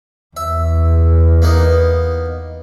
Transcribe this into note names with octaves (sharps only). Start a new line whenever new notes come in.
E2 E5
A#3 B3 D#4